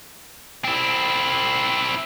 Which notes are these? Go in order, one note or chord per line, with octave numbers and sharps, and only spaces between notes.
C4 E4